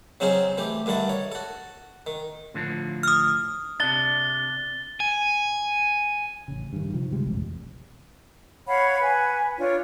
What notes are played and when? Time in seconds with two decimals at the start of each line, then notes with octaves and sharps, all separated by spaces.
0.20 C#3 F#3 C4 C#4 D#4 G#4
0.58 E3 A3 G4
0.86 G2 D3 D#3 E4 A5
1.09 C#5
1.32 F#4 A4
2.07 D#3
2.54 A2 D3 F3
3.03 D#6 F6
3.80 C3 D4 A6 G7
5.00 G#5
6.48 A1 C#3
6.73 G2 D#3
6.93 C3 D#3 F3
7.11 D2 C3 G3 G#3
7.23 E1 A1 F2
8.66 C#5 F5 F#5 B5
9.01 B4 G#5
9.57 D4 F4 C#5